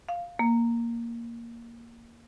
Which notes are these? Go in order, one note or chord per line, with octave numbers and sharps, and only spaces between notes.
F5
A#3